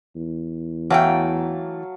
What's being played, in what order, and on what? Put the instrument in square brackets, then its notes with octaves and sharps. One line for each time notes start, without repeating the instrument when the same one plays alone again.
[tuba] E2
[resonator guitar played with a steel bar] E3 A3 G5 [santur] F#3 F5 A5